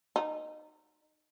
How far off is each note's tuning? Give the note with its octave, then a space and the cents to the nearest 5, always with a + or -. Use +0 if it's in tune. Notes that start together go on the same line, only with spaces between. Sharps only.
D#4 -20